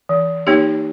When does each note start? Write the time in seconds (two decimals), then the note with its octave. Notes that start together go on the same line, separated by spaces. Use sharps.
0.09 E3
0.47 A#3 D#4 G4 C#5